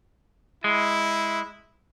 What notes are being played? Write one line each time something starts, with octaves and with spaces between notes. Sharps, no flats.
G#3 E4